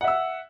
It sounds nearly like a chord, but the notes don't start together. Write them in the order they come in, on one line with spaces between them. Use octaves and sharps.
F#5 E5 E6